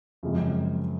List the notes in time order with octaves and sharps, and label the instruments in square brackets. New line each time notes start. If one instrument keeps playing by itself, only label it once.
[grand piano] F#2 C#3 F3 G#3 C4